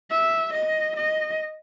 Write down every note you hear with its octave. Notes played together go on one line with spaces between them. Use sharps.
E5
D#5
D#5